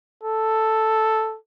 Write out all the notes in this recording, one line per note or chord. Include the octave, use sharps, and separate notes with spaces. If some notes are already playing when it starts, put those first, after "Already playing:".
A4